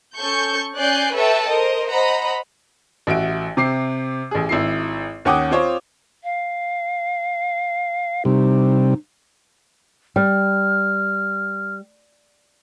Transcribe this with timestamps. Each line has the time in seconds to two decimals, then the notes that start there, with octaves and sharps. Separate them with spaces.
0.17 C#4 A4 C#6 G6
0.76 C#4 D5 G#5 F#6 G6 C7
1.15 A4 B4 C#5 E5 G5 A5
1.49 A#4 C5 D#5
1.89 C5 D#5 F#5 A#5 B5
3.07 A1 F#4 E5 D7
3.57 C3 C4 D6 C7
4.31 A1 G#4
4.49 G#1 E4 C7
5.25 D#2 C#4 F#5 G5 D6 D#6
5.51 C4 F4 C5 C#5
6.23 F5
8.25 C3 G3 D#4
10.16 G3 F6